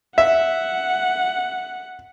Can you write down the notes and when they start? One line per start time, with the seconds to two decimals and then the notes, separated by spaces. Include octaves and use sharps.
0.18 E5 F#5